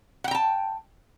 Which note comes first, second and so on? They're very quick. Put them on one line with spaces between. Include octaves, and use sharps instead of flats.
F#5 G5 A#5 A5